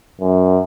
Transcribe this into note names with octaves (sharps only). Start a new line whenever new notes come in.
F#2